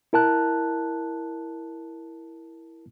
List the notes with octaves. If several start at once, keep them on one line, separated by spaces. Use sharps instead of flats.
E4 A#4 A5 F#6